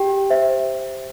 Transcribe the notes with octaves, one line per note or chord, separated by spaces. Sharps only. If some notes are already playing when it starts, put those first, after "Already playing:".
Already playing: G4 G5
C5 E5